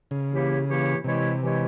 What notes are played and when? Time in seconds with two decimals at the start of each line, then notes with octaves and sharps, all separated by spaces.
0.11 C#3
0.29 E3 A#3 E4 G4 C#5
0.67 E3 A#3 E4 G4 C#5
1.04 C3 E3 G#3 E4 G4 C#5
1.41 E3 G#3 E4 G4 C#5